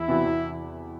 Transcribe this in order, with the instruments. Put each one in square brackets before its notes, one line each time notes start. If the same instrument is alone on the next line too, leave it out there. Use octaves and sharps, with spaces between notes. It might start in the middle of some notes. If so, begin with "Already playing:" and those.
Already playing: [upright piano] E2 [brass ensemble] E4
[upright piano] C3 E3 B3 F#4
E2